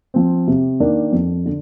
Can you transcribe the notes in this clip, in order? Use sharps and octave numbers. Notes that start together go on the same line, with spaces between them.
F3 C4
C3
D#3 A#3 D4
F2
D3